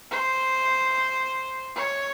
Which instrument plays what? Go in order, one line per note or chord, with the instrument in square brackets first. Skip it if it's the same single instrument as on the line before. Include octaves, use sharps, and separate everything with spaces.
[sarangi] C5
C#5